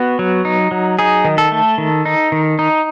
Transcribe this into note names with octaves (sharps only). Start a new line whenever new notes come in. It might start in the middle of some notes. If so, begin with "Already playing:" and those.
Already playing: B3 F#4
F#3
D#4
F#3
D#4 G#4
D#3
A4
A3
D#3
D#4
D#3
D#4